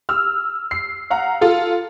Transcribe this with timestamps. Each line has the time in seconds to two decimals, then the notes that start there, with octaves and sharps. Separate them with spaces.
0.09 E6 F6
0.71 C7
1.10 F5 F#5 A#5
1.41 F4 A4